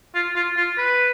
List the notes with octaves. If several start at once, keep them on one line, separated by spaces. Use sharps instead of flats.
F4
F4
F4
B4